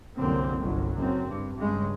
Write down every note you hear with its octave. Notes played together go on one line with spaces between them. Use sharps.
C2 F#2 D3 A#3 C4
G1 C2 F#3
F#1 F#2 C4
G2
G2 C#3 G#3